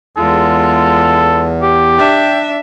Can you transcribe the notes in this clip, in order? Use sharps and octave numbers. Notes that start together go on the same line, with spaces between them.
E2 G#3 F4 A4
G4
D4 E5 G5